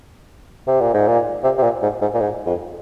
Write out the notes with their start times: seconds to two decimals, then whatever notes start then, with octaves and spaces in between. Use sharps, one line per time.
0.67 C3
0.81 A#2
0.94 G#2
1.08 A#2
1.43 C3
1.58 C3
1.63 A#2
1.82 G#2
2.01 G#2
2.14 A#2
2.20 G#2
2.46 F2